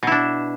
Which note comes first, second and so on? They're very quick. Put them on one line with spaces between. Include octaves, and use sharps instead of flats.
B2 E4 D4